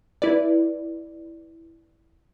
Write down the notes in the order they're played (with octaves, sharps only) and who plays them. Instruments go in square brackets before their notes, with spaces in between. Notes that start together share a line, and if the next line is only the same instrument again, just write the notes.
[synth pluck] E4 B4 D5